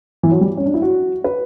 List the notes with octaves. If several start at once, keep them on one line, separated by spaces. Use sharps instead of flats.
E3
F#3
G3
C#4
D4
E4
F#4
B4